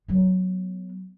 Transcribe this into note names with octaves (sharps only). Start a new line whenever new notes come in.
F#3 B3